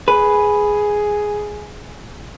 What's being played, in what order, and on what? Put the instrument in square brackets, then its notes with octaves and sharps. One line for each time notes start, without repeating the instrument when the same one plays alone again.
[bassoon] G#4 [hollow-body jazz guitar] B4